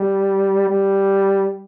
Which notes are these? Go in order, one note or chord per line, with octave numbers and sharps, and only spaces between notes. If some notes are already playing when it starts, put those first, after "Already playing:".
Already playing: G3
G3